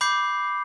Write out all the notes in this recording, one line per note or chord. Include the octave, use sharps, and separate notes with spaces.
B5 D6 G6 C7